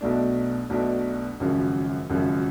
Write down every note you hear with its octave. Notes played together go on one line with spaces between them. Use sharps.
B1 B2 A3 D4
B1 B2 A3 D4
G#1 F#2 C#3 F3
G#1 F#2 C#3 F3